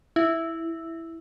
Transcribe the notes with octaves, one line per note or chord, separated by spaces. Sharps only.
E4